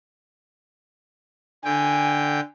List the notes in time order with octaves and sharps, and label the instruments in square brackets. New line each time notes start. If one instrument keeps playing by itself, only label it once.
[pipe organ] D3 G5 [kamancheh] G#5